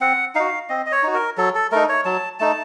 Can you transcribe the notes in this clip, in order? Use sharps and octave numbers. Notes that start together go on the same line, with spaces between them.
C4 F#5
D#4 F#4 F5
C4 D#5
D#5
C#5
D#4 F#4
A#4
F#3 A4
A4
A3 D#4 A#4
C#5
F#3 A5
A3 D#4 A5